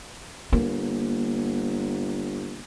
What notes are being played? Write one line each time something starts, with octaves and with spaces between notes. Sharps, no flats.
G1 A#3